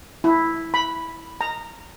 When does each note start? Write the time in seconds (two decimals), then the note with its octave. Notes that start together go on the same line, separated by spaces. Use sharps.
0.24 E4
0.74 B5
1.41 A#5